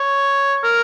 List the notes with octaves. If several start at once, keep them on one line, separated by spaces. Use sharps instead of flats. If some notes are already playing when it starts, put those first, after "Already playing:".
Already playing: C#5
A#4